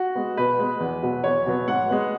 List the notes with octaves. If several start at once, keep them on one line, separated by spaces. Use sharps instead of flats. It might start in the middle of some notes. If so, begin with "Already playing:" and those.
Already playing: F#4
G#3 B3
B2 B4
G#3 B3
E2
B2 F#3 B3
E2 C#5
B2 F#3 B3
G#2 F#5
G#3 B3